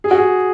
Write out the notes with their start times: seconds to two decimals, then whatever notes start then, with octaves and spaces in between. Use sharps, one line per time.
0.04 G#4
0.11 F#4
0.18 G#4